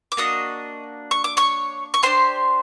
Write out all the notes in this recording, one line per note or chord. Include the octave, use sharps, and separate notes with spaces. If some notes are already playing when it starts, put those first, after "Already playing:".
D6
A#3 D4 F#4 D#5 D#6
C#6
D6
C#5 C#6
C#6
D4 G4 C5 C6